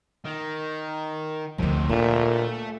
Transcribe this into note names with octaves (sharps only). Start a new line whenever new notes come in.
D#3
D2 C3 D#3 F3
A#2 A3 D4